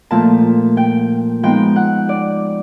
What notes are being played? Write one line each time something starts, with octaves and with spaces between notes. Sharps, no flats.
A#2 F3 A3 A5
G5
F3 G#3 B3 D#4 G5
F#5
D5